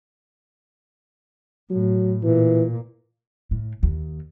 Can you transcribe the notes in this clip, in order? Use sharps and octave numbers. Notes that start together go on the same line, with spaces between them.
A2 F#3
A#2 E3
A2
D#2